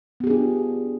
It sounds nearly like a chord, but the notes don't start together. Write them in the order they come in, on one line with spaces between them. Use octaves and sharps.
B3 G4 G#4 D4 F4